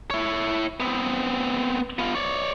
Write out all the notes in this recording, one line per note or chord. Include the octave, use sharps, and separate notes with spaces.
E4 C#5
B3 C4
B3 F4
C#5 D5